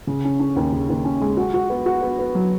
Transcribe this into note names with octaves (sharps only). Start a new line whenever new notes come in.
C#3
C#4
C#4
D#2
C#3
D#2
C#4
G#3
F#4
F#4
B3
F#4
B3
B3
F#3